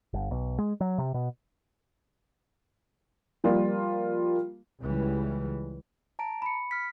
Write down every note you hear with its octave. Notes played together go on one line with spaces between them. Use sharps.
G1
B1
G#3
F#3
C3
B2
F3 G3 A#3 F4
C#2 C#3 E3 G3
A5 A#5 D7
B5 C#7
F6 B6